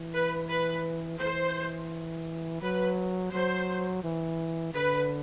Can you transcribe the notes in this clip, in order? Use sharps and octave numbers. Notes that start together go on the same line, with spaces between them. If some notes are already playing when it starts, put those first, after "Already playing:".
Already playing: E3
B4
B4
E3 C5
F#3 B4
F#3 C5
E3
D3 B4